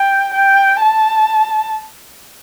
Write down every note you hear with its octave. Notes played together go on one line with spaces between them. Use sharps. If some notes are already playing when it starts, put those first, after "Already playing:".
Already playing: G5
G5
A5